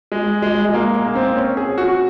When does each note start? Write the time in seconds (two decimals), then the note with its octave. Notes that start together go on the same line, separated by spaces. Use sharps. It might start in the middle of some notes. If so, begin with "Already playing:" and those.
0.12 G#3
0.42 G#3
0.65 G#3
0.74 A#3
0.95 A#3
1.07 A#3
1.15 C4
1.36 C#4
1.57 G#4
1.78 F#4